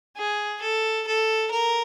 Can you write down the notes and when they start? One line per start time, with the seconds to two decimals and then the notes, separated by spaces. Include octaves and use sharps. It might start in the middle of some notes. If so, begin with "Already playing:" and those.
0.16 G#4
0.61 A4
1.07 A4
1.50 A#4